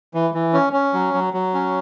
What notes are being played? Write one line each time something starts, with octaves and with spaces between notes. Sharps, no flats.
E3
E3
C#4
C#4
F#3
F#3
F#3
C#4